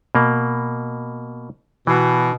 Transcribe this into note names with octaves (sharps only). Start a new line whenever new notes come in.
B2 A#3
B2 E3